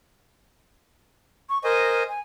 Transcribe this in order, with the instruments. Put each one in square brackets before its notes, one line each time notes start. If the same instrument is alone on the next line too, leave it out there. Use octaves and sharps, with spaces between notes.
[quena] C#6
[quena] A#4 [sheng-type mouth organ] C5 D#5 G#5
[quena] G#5